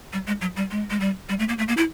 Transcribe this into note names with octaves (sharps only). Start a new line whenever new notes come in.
G3
G#3
F#3
G3
G#3
G#3
G3
G3
A3
A#3
A3
A#3
E4